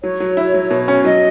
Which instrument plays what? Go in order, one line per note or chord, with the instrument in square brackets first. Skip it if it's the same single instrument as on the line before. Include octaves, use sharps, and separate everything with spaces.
[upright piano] F#3 [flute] C#5
[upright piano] F#3
E4
F#3
B2
C#4
[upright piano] F#3 [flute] D#5